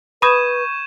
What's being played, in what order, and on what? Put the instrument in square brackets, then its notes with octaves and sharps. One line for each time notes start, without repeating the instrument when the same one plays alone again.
[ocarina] B4 [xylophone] B5 D#6 [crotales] C#6 G6 E7 [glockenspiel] G#6 D#7